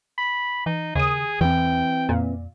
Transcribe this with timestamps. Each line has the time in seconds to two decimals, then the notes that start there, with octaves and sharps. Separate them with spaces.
0.18 B5
0.66 E3 D#4
0.95 D#2 C#3 G#4 D#6
1.41 E2 E3 C4 G5
2.09 F2 A#2